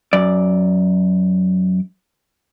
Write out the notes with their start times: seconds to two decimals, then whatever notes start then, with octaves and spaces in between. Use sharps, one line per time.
0.13 F#2 D5